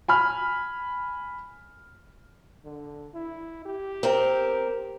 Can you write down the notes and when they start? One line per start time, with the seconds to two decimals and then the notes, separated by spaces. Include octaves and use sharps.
0.08 G#5 B5 F6
2.65 D3
3.14 E4
3.65 G4
4.03 C4 A#4